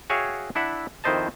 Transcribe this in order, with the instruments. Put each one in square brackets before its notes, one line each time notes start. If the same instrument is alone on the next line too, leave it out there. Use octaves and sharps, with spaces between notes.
[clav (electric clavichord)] F#4 G#4 C#5 E5 F5 G5
D4 E4 E5 F#5
F2 D#3 E4 C5 D#5 A5